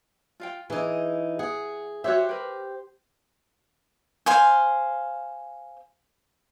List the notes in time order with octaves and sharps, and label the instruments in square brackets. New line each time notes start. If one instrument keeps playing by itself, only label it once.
[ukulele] F4 F5 G5
[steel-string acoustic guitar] E3 D#4 [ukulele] G#4
[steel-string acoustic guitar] G#4 [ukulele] F#5
[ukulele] F#4 C#5 E5 [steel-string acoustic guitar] G4 C5
[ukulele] A#4 B4
[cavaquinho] C5 F5 G#5